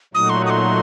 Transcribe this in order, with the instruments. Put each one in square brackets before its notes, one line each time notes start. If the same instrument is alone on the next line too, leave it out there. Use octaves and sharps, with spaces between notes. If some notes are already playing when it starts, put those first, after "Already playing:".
[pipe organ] A#2 F#3 A3 D#4 F#4 [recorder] D#6
[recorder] C6
D#6
C6